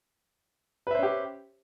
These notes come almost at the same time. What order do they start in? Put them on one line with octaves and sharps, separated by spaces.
B4 E5 C5 C#4 G4